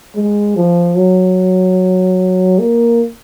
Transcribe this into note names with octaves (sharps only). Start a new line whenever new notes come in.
G#3
F3
F#3
A#3